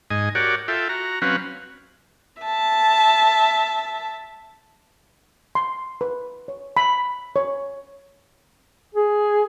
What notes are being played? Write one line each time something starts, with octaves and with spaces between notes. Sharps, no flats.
G#2 D#5 G#5
F#4 G4 A#4 C#5 D5 F#5
F4 A4 E5 G5
F#4 A#5
F#3 C4 C#4 B4 F5 F#5
E5 A5
C6
B4
C#5
B5
C#5
G#4